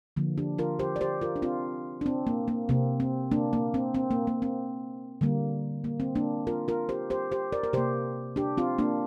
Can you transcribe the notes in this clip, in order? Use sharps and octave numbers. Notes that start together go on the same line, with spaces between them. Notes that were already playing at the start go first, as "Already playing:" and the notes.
D3 F3 A#3
D4 G4
F4 A#4
G4 C5
D5
G4 C5
F4 A#4
D4
C4 F4
D4
C4
A#3
A#3
C3 A#3 C4
C4
A#3 D4
A#3
C4
C4
A#3
A#3
C4
D3 G3 A#3
A#3
C4
A#3 D4
F4 A#4
F4 A#4
G4 C5
G4 C5
G4 C5
A#4 D5
A#4
C3 A#3 G4 C5
D4 G4
C4 F4
A#3 D4